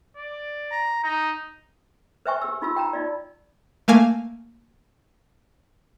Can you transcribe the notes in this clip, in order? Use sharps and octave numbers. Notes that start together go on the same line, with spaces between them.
D5
A#5
D#4 A#5
B4 C5 E5 G5 G#5 C#6
G4 E6
D#4 F4 F#4 E6
G5 A5 A#5
D#4 F4 D5
A3 A#3 F5 G#5